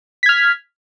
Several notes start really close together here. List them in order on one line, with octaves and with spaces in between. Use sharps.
B6 G#6 F6